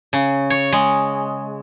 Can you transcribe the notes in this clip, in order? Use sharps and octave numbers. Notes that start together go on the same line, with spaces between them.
C#3
C#5
G#3